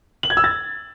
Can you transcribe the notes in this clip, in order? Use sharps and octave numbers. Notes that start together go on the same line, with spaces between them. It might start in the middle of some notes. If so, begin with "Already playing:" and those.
F#7
G#6
E6
A6